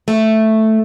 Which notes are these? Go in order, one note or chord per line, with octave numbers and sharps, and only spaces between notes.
A3